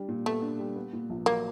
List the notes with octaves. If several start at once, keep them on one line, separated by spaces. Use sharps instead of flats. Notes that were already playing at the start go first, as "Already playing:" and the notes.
Already playing: G3 D4
A#2
A3 B3
D4
G3
B3
A#2
A#1
F#3 A#3